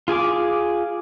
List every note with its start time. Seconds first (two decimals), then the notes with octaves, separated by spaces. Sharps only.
0.08 F4 G#4 G#5 D6